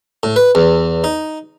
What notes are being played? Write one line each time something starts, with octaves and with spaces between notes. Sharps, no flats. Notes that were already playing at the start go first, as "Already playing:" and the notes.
A2
B4
E2
D#4